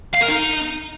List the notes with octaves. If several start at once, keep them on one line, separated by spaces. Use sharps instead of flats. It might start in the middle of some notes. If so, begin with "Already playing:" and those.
F5
A#4
D#4